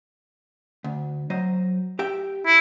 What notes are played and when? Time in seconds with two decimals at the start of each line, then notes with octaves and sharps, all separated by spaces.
0.84 D2
1.30 F#3 C5 D#5
1.99 G4 E5 G5
2.46 E4